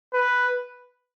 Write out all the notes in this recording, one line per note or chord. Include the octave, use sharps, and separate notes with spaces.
B4